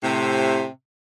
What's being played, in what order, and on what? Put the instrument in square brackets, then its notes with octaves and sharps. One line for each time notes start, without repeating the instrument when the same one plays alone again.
[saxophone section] A2 C3